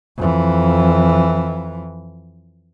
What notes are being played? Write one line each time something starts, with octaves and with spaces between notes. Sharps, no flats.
F2 E3